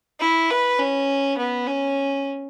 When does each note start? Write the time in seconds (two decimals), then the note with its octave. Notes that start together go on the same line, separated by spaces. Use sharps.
0.20 E4
0.50 B4
0.79 C#4
1.38 B3
1.67 C#4